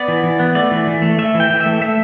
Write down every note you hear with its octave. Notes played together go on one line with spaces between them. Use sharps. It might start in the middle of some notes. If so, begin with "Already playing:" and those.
Already playing: B3 D5
E3
E3
B3
A3 D5
E3
E3
A3
A3 E5
E3
G5
E3
E5
A3
A3 E5